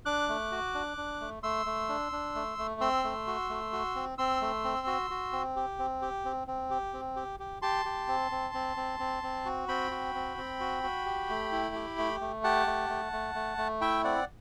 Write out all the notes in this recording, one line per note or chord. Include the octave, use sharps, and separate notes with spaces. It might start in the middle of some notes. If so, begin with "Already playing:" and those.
D4 D6 F#6
A3
F#4
D4
D4
A3
A3 C6 E6
A3
D4
D4
A3
A3
C4 C6 E6
A3
F#4
A3
F#4
C4
C4 C6 E6
A3
C4
F#4
F#4
C4
G4
C4
G4
C4
C4
G4
C4
G4
G4
G4 A5 C6
G4
C4
C4
C4
C4
C4
C4
F#4
C4 G5 B5
F#4
C4
C4
F#4
F#4
G4
A3
E4
G4
A3
A3
G4 F#5 A5
A3
A3
A3
A3
A3
E4 E5 G5
C4 D5 F#5